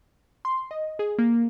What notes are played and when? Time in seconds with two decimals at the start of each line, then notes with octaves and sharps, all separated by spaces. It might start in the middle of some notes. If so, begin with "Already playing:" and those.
0.45 C6
0.71 D#5
0.99 G#4
1.19 A#3